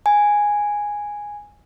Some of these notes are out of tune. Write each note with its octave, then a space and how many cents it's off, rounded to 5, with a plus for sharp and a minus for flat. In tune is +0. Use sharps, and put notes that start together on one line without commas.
G#5 -5